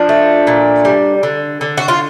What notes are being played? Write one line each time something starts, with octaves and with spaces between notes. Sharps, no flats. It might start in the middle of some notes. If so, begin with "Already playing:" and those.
Already playing: F3 D4
A3
A#2
G3
D3
D3
F#4
F4